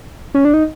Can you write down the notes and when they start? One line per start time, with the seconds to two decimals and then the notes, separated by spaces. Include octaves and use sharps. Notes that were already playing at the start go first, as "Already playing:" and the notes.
0.34 C#4
0.45 D4
0.54 D#4